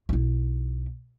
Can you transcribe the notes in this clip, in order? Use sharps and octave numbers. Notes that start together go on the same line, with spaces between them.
B1 E4